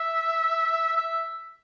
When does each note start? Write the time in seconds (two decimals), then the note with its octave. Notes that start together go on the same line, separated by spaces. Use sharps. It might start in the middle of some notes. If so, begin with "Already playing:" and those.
Already playing: E5
0.97 E5